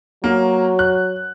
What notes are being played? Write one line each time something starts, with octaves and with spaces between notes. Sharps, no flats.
F#3 A#3
F#6